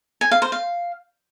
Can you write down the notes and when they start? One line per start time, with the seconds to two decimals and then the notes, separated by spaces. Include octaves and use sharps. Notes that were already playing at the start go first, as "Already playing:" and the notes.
0.21 G#5
0.31 F5
0.42 C5
0.52 F5